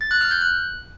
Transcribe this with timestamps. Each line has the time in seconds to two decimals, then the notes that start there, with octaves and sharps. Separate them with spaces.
0.01 A6
0.11 F#6
0.21 F6
0.31 G6
0.41 F#6